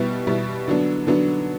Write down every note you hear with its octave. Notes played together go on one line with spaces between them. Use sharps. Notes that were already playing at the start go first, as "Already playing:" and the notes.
Already playing: B2 G3 B3 E4
B2 G3 B3 E4
D3 F#3 B3 D4
D3 F#3 B3 D4